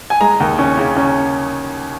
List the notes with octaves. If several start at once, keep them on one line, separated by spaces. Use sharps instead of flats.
G#5
G#3 A#5
D#2
C#4
C#3
C#4